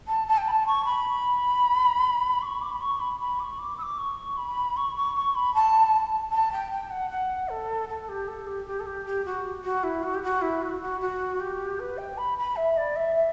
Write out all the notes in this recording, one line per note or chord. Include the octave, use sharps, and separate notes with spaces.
A5
A5
G5
B5
A5
C#6
B5
D6
C#6
D6
B5
C#6
B5
B5
D6
C#6
D6
E6
D6
C#6
B5
C#6
C#6
C#6
B5
A5
A5
G5
G5
F#5
F#5
A4
A4
G4
A4
G4
G4
A4
G4
G4
F#4
F#4
E4
F#4
G4
F#4
E4
F#4
F#4
F#4
G4
B4
G5
B5
B5
E5
D5
E5
E5